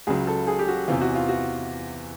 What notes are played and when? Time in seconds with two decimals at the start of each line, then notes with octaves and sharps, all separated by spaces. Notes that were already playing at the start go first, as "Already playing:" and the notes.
0.07 C#2 C#3 F#3 G#4
0.27 A4
0.47 G#4
0.59 G4
0.68 F#4
0.88 E2 C3 E3 F4
1.01 F#4
1.15 F4
1.29 F#4